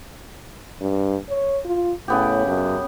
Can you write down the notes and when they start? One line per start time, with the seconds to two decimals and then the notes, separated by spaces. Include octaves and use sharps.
0.81 G2
1.29 C#5
1.65 F4
2.08 A2 C#3 B3 G4
2.46 F#2